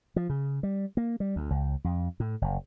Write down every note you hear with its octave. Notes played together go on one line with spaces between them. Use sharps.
F3
C#3
G3
A#3
G3
D2
C#2
F2
A2
F#1